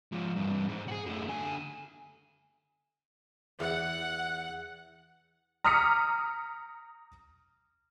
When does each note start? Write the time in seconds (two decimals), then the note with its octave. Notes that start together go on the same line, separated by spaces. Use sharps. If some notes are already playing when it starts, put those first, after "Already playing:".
0.12 G#2 F3
0.36 G2 E3
0.68 G#2
0.88 F#4 G#4
1.06 F#2 A3
1.28 D3 G#5
3.60 E2 F#5
5.64 A#5 D6 D#6 F6 B6 C#7